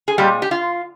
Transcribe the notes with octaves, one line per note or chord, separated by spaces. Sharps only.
G#4
A#2 G3 G#3 C4 G4
G4
F4